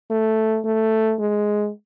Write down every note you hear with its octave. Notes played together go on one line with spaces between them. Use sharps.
A3
A3
G#3